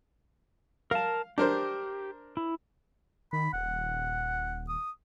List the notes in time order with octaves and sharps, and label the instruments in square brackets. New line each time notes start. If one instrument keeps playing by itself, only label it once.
[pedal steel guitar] A#4 A5 [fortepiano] F5
[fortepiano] D4 A#4 C5 [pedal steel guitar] G4
[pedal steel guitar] E4
[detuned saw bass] D#3 [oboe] B5
[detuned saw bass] D#1 [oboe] F#5
[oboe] D#6